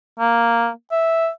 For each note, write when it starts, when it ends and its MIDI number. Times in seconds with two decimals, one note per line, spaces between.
0.20 0.69 58
0.91 1.29 76